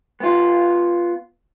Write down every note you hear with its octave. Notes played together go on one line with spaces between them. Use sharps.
B3 F4